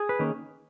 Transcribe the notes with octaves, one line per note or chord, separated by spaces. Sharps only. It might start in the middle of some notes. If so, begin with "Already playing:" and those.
Already playing: G#4
B4
D#3 A#3 C#4